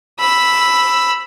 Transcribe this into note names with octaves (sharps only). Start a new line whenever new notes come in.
B5 E6